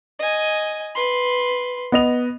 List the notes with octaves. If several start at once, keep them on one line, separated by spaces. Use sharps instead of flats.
D#5 G#5
B4 C6
B3 D#5 F7